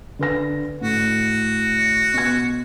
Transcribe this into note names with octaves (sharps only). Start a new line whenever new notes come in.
D3 B4 A#6
A2 F#4
B2 G#6